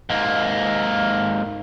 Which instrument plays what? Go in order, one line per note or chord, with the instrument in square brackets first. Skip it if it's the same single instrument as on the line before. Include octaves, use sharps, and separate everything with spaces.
[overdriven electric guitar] G#2 A#3